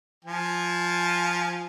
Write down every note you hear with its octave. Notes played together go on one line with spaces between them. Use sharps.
F3 G#5